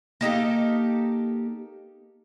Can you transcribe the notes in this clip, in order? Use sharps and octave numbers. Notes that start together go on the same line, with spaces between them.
A#3 D#4 G4 A4